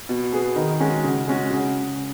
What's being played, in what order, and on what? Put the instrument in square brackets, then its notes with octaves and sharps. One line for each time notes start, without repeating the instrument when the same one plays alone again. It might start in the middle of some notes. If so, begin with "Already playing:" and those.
[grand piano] B2
B3 G#4
D#3
G#3 C#4 F#4
C#3
G#3 C#4 F#4
C#3